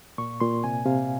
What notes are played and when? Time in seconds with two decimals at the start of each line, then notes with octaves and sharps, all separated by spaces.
0.18 A#2 C#6
0.40 A#2 C6
0.64 C3 G#5
0.85 C3 F5